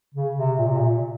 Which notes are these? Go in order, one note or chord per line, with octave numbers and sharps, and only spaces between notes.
C#3
C3
A#2
C3
A#2